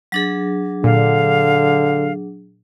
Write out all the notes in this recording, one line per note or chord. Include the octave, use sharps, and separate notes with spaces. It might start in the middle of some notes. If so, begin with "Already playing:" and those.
F#3 D4 G#4 A6 A#6
A#2 D3 F5